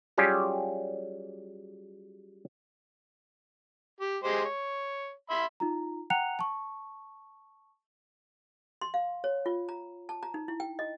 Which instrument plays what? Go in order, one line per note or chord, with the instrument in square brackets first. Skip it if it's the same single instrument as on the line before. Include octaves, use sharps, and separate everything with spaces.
[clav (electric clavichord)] F#3 G3 C#4 F4 G4 G#4
[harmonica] G4
G#3 G4 C5
C#5
E5 B5 C6
[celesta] D#4 F4 A#5
F#5 G5 A#5 F#6 C#7 F7
A5 C#6
[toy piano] C6
F5
C#5
F4
A#5
A5
A#5
D#4
E4
G5
D#5